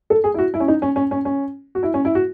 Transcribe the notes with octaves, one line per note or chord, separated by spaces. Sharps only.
A4
G#4
E4
F#4
E4
C#4
D#4
C#4
C#4
C#4
C#4
F#4
E4
C#4
E4
F#4